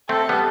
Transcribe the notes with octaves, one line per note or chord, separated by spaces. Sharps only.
A3 C4 A4
G3 B3